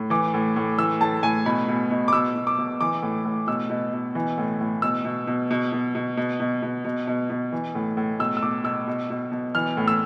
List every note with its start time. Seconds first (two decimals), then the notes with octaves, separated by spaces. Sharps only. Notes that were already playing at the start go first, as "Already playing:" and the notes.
Already playing: A2
0.10 E3 D6
0.34 A2
0.56 A2
0.78 E3 E6
1.01 A2 A5
1.23 A2 G#5
1.46 B2 B5
1.68 B2
1.91 B2
2.08 D6
2.13 B2 E6
2.35 B2
2.47 D6
2.59 B2
2.81 E3 D6
3.03 A2
3.25 A2
3.47 B2 E6
3.70 B2
3.93 B2
4.15 E3
4.38 A2
4.61 A2
4.82 B2 E6
5.05 B2
5.27 B2
5.51 B2
5.72 B2
5.95 B2
6.17 B2
6.40 B2
6.62 B2
6.85 B2
7.07 B2
7.30 B2
7.52 E3
7.75 A2
7.97 A2
8.19 B2 E6
8.37 E6
8.42 B2 D6
8.64 B2 E6
8.88 B2
9.10 B2
9.32 B2
9.55 E3 F6
9.77 A2
9.88 E6